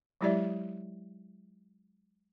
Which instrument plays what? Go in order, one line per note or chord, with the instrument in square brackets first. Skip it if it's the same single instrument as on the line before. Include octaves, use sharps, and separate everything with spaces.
[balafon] F#3 G#3 E4 G4 D5 E5